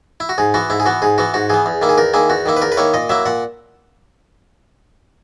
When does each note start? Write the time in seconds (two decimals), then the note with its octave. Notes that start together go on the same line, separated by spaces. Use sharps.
0.20 E4
0.29 F#4
0.38 G#2 G#4
0.54 E3 B3 F#4
0.70 G#2 E4
0.80 G#4
0.86 E3 B3 F#4
1.02 G#2 G#4
1.18 E3 B3 F#4
1.34 G#2 F#4
1.50 E3 B3 G#4
1.66 E2
1.82 D#3 A#3 E4
1.89 G#4
1.98 E2 A#4
2.14 D#3 A#3 E4 G#4
2.30 E2 F#4
2.46 D#3 A#3 E4
2.57 B4
2.62 E2 A#4
2.72 B4
2.77 D#3 A#3 E4 C#5
2.94 A#2 D#5
3.09 F#3 A#3 E4 E5
3.26 A#2 F#5